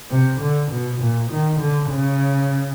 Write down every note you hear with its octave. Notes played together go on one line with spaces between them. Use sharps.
C3
D3
B2
A#2
D#3
D3
C#3